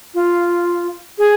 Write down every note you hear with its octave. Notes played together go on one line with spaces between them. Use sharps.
F4
G#4